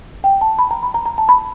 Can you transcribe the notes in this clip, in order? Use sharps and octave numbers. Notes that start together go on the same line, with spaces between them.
G5
A5
B5
A#5
B5
A#5
A#5
A5
B5